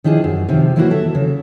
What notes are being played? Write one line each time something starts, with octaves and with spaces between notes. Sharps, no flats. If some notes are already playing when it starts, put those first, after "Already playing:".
D#3 F3 D4 E4 G#4
F#2
C3 D#3 F3
E3 F#3 A#3 D#4 E4 F#4
A4 E5
C#3